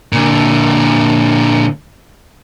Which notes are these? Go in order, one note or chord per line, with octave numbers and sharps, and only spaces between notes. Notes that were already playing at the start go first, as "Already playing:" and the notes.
A#2 D3